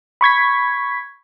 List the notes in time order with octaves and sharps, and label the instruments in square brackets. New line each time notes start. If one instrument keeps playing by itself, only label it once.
[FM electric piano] B5 C#6 G#6 B6